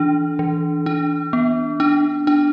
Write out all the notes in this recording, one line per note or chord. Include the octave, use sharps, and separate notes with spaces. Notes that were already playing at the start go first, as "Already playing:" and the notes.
Already playing: E3 D4
E3
D4
B3
D4
D4